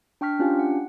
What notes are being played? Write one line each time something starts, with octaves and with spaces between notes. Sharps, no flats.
D4 G5 C#6 F6 B6
C#4 D4 F4 G4 G5 G#5
F#5